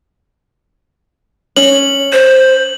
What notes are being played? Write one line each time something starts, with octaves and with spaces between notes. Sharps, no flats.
C#4 F#7
C5